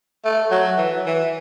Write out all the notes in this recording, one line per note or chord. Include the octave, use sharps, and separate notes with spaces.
A3
F#3
E3
E3